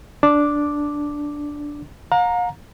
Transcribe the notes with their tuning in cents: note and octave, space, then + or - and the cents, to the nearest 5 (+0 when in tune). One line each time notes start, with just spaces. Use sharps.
D4 -5 D6 +0
F5 +45 A#5 +0